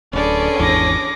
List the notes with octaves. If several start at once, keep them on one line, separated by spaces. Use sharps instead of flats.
D1 C#4 D4 G#4 A4 B4 C5 D5
G#1 E2 D6 A#6